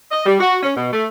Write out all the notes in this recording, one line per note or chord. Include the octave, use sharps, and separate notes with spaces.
D#5
G3
F#4
C#4
B2
A3